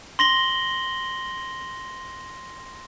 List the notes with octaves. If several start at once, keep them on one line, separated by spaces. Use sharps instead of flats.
C6 A#6 F#7 G7